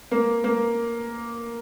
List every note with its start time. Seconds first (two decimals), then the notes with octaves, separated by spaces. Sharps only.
0.11 A#3
0.44 A#3